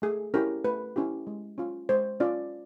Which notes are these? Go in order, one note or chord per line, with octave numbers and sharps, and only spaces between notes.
A3 G#4
C#4 E4 G4 A#4
A3 B4
C#4 E4 G4
G#3
C#4 F4
G#3 C5
C#4 F4 D5